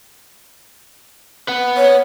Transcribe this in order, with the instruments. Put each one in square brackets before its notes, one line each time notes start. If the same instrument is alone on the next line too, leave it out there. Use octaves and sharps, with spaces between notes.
[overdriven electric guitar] B4 F#5
[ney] C#5